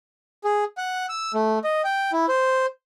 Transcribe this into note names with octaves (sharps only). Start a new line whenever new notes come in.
G#4
F#5
E6
A3
D#5
G5
E4
C5